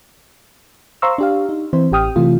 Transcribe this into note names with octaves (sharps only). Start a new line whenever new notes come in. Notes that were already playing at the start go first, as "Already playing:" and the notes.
C5 F5 A#5 C6 C#6 E6
D4 G4 F5
D#4
E3 C4 E4 C5
A1 G4 G5 D#6 F6
C3 E3 A3 F4